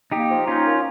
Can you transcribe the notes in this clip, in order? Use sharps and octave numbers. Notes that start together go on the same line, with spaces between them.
A#3 D#4 G4
F3
C#4 D#4 F4
A#3